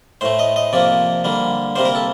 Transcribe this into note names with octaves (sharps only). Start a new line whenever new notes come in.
A2 A3 C5
D#5
D#5
C3 F3 A#3 D5
D3 G3 A#3
C3 G3 A#3 C5
A#4
A4